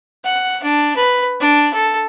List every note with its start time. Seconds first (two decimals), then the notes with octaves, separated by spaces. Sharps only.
0.25 F#5
0.63 D4
0.96 B4
1.41 D4
1.74 A4